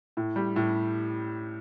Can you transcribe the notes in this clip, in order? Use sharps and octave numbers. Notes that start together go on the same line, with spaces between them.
A2
G3
A2